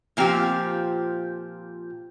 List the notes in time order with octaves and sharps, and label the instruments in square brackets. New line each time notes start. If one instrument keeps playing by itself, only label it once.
[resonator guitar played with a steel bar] A#2 F3 C4 G4